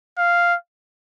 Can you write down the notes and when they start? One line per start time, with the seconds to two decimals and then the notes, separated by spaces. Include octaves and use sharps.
0.18 F5